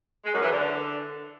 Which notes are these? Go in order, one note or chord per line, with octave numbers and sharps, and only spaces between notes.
G#3
F#2
E3
D3